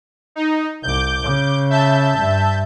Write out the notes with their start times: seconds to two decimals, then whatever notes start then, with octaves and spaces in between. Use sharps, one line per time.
0.36 D#4
0.83 C2 D6 G6
1.22 C#3
1.70 E5 A5 G6
2.19 G2